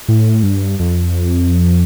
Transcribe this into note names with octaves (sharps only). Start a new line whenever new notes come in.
A2
G2
F2